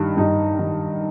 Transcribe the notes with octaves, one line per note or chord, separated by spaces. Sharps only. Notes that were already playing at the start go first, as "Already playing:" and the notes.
Already playing: G2 D#3
G2 D#4
D#3